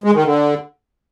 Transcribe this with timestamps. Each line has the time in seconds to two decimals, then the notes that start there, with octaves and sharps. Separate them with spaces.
0.04 G#3
0.14 D#3
0.25 D3